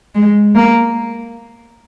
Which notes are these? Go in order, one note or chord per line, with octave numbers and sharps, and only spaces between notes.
G#3
A#3